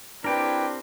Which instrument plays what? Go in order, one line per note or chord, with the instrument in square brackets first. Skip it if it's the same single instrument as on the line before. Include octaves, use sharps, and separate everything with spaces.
[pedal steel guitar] C4 G4 A#4 [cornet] D4 [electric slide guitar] E4 G5 [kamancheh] B4